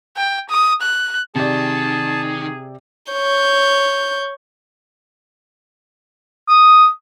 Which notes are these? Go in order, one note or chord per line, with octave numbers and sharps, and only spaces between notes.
G5
D#6
F#6
C3 D#3 G#4 D5 A5
C#5 G6
D#6